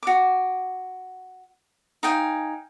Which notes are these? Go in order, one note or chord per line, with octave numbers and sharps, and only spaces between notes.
F#4 D6
D#4 F5 G5 G#5